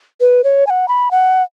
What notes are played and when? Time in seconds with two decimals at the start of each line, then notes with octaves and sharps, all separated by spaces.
0.21 B4
0.44 C#5
0.67 G#5
0.70 F#5
0.88 B5
1.11 F#5